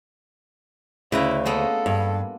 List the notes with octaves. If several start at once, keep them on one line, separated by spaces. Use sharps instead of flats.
D2 C#3 E4 B4 A#5
G#3 A#3 B3 A4
G2